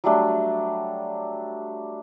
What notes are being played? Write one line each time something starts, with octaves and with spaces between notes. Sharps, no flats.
F#3 G3 A3 D4